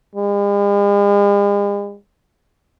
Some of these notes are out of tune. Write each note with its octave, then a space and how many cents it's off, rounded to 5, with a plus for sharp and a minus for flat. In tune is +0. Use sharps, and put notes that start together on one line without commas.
G#3 -45